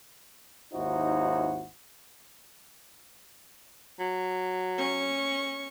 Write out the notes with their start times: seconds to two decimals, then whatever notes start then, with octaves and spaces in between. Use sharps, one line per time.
0.73 G#1 D#2 D#4 E4 F#4 C5
3.99 F#3
4.78 C#4 C#6